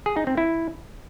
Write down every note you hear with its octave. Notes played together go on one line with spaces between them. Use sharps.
G#4
D#4
C4
E4